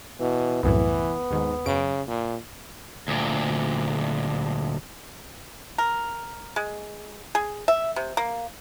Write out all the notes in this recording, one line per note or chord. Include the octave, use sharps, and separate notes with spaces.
B2 E3
C2 F#2 A2 E3 B3
D#2 G#2 D#3
F#2 C#3 D7
A#2
D2 A#2
A#4
G#3
G#4
E5
C3
A#3